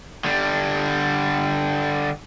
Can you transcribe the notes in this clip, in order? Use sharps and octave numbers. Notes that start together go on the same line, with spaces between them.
D3 G3